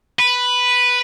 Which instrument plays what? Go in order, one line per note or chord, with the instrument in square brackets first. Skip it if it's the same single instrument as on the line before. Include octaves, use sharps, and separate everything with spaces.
[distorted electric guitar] B4